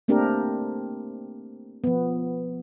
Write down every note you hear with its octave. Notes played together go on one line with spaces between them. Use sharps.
A3 A#3 C4 D4 G4 A#4
F3 B3